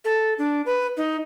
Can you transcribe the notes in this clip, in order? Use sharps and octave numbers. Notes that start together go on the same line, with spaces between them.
A4
D4
B4
D#4